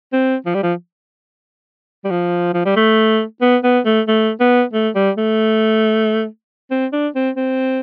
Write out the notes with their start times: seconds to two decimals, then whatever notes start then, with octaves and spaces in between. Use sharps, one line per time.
0.13 C4
0.46 F3
0.55 G3
0.63 F3
2.05 G3
2.10 F3
2.54 F3
2.65 G3
2.76 A3
3.42 B3
3.64 B3
3.86 A3
4.08 A3
4.40 B3
4.73 A3
4.95 G3
5.18 A3
6.71 C4
6.93 D4
7.15 C4
7.36 C4